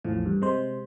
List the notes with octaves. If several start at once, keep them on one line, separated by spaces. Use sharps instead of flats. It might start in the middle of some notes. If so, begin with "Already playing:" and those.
A1 E2 A2 F3
G2
C3 G#3 C5